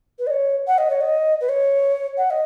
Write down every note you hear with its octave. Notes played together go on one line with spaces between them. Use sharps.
B4
D#5
C#5
F#5
D#5
C#5
D#5
B4
C#5
F#5
D#5